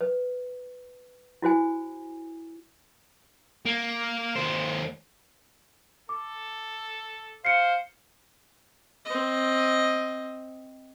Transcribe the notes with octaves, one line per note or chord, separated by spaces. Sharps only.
B4
E4 F#4 C5 G#5
A#3
D#2 C5
A4 D6
C5 F5 C7 C#7
C4 D#5